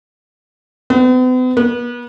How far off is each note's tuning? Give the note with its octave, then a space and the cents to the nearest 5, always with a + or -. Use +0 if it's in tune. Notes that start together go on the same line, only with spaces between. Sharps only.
B3 +45
B3 -35